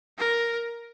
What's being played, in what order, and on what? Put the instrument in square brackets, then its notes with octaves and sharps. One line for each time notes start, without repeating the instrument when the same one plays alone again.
[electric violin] A#4